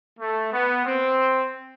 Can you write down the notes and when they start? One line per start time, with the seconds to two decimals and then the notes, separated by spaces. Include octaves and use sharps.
0.19 A3
0.52 B3
0.85 C4